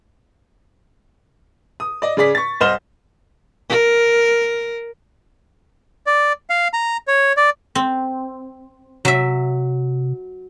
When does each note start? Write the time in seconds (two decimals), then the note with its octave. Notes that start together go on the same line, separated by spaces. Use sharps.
1.80 D#6
2.02 D5 D#5
2.17 C#3 G#4 D5 B6
2.35 C#6 A6
2.60 C2 C5 D#5 F6 E7 G7
3.70 A#4
6.07 D5
6.50 F5
6.73 A#5
7.08 C#5
7.37 D5
7.75 C4
9.05 C3 F#3 E5